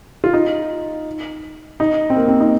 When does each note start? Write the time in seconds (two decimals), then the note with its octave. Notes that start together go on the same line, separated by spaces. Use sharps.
0.24 F4
0.33 D#4
1.80 D#4
2.10 C4
2.16 A#3
2.28 C4
2.40 D#4